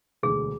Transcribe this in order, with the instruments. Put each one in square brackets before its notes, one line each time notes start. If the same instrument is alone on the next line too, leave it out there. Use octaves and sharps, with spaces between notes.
[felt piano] E1 D2 D3 [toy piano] G#4